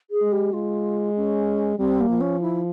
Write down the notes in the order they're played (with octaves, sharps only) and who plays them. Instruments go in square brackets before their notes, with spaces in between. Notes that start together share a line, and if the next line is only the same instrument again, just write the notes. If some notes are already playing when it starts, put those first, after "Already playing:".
[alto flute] G#4
[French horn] G#3
[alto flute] G4
[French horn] G#3 [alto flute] F4
[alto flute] C#4
[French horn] G3 [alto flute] C4
[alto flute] A#3
[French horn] F3
[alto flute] C#4
E4